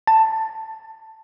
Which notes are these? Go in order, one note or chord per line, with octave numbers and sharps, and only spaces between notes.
A5